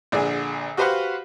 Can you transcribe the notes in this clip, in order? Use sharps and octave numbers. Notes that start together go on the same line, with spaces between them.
A#1 D3 D4 G#4
F#4 G4 B4 C5 F5 F#5